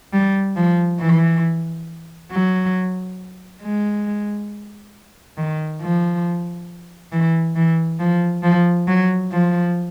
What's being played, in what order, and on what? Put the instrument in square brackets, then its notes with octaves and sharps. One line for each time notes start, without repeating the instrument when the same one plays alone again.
[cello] G3
F3
E3
F#3
G#3
D#3
F3
E3
E3
F3
F3
F#3
F3